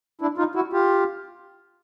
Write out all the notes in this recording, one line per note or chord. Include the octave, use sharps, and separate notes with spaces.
D4 E4
D#4 F4
E4 F#4
F4 G4